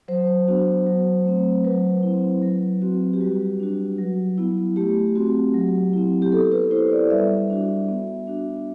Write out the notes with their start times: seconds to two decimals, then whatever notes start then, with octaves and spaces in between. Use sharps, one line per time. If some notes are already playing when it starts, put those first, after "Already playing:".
0.08 F#3 C5
0.48 B3 D4 F#4
0.86 F#3
1.25 A3 C4
1.64 F#3 B4
2.03 C4 E4
2.42 F#3
2.82 C4 F#4
3.13 G4
3.21 G3 F#4
3.60 D4 F#4
3.98 F#3
4.38 B3 E4
4.76 A3 G4
5.15 C4 F#4
5.54 F#3
5.93 C4 E4
6.22 G4
6.32 B3 A4
6.52 B4
6.71 E4 C5
6.92 D5
7.10 G3 E5
7.50 D4 F#4
7.89 B3
8.27 D4 F#4